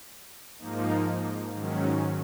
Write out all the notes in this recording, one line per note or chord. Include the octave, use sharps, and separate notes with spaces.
G#2 F3 A#3 D#4
G#2 D#3 F#3 C#4